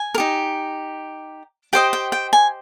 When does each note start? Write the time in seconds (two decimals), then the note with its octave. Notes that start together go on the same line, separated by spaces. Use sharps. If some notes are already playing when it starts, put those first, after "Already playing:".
Already playing: G#5
0.14 A#4
0.18 D#4 G4
1.73 G4 C5 D#5 G5
1.93 G5
2.12 G5
2.33 G#5